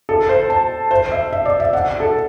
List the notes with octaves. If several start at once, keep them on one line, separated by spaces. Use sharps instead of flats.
A4
C5
A5
C5
E5
E5
D5
E5
F#5
A4